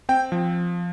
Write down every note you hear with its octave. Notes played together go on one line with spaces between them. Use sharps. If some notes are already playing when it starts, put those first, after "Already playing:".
C4 G5
F3